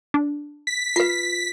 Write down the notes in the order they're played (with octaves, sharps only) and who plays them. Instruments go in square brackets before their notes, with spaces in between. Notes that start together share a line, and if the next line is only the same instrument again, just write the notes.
[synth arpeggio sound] D4
[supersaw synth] B6
[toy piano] F4 B4 [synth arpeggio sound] C7